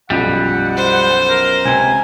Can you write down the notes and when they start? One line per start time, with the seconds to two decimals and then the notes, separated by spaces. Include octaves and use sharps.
0.10 B1 F#2 F3 G3 F#5
0.77 C5
1.29 A#4
1.65 C#2 C3 G#5